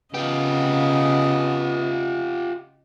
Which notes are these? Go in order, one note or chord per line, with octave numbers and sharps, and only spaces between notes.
C#3 B3 F4 G4 D#5